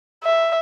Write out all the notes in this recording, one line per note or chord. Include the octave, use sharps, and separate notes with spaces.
E5